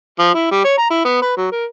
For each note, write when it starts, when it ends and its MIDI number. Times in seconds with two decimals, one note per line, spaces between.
0.19 0.31 53
0.34 0.48 64
0.51 0.61 55
0.65 0.74 73
0.78 0.89 82
0.90 1.00 64
1.05 1.20 59
1.22 1.34 71
1.37 1.50 54
1.52 1.66 70